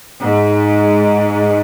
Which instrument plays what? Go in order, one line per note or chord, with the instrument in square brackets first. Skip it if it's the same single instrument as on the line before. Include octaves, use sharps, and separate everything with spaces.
[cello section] G#2